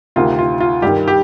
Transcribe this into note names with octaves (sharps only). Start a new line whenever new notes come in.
D2 C3 D#3 F4
F4
F4
G2 D#3 G4
G4